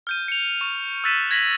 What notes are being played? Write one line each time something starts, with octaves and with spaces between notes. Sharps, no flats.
F6 G6 D#7
C#7 F7
C#6
E6 F#6 A6 B6 D#7 E7
G#6 A#6 B6 F#7